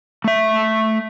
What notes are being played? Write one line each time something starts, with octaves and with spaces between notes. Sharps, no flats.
A3 E5